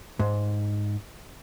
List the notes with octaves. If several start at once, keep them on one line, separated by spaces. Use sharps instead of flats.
G#2